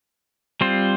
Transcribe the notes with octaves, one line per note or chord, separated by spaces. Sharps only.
G3 C4 F4 C5